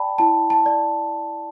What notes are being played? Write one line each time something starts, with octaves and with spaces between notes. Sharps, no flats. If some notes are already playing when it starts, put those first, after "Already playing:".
Already playing: D5 G5 A5 B5
E4 A5
A5
D5